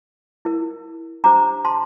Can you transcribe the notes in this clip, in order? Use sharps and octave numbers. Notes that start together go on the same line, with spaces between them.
E4 A#4
D4 G4 C5 A#5 D6
A5 C6